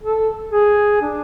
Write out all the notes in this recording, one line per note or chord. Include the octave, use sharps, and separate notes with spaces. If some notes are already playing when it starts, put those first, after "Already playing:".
A4
G#4
D4